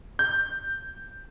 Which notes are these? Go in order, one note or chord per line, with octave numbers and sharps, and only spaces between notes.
G6